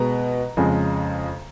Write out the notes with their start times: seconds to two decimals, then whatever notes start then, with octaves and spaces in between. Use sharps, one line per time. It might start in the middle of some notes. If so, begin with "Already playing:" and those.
Already playing: B2 G#3 B3 A#5
0.57 F2 C#3 G#3